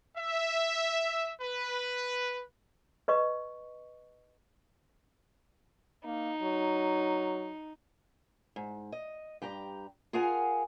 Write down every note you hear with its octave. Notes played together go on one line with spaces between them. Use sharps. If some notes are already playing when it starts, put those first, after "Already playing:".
E5
B4
B4 D#5 C#6
A#3 D#4
F#3
G#2
D#5
G2 G4 G5 A#5
F4 G#4 A#4 F5 F#5 G#5